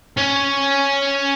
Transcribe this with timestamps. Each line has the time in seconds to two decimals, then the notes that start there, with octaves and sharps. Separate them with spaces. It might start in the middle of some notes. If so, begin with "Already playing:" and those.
0.17 C#4